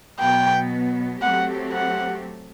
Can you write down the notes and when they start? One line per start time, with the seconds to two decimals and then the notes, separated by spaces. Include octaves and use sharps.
0.19 B2 F#3 B3 G5
1.21 F#3 A3 C4 G4 F#5
1.73 F#5